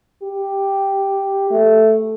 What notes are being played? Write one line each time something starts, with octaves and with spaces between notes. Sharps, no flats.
G4
A3